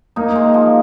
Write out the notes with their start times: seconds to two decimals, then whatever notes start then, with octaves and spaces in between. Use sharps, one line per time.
0.16 A#3 D#4
0.36 G#3
0.54 F3